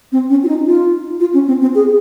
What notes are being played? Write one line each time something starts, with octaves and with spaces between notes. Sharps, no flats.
C4
C#4
F4
D#4
F4
F4
C#4
C4
C4
G#4